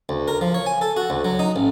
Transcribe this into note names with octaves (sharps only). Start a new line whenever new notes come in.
D2
A#4
F3
C#5
G#5
A4
F#4
D2
F#3
D#4
A1